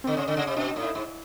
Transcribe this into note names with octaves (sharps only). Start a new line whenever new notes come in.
D3 C4
C#3 C#4
D3
C#3
C3
B2 D4
D#4
A2
E4
G#2